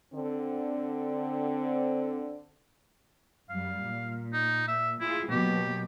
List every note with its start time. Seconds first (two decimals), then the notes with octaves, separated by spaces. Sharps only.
0.14 D3 C4
3.50 F#2 G3 F5
3.84 A#2
4.33 D#4
4.68 E5
5.01 E4 F4 G#4
5.30 B2 F#3 A#3 G4